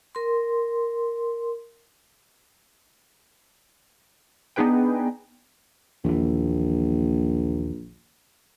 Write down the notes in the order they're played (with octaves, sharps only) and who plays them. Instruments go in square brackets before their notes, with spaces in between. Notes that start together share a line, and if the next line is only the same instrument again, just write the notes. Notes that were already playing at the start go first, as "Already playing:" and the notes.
[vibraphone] A#4 C6
[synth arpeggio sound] B3 D4 D#4 G#4 B4 G5
[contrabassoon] A#1 [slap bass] D#2 E3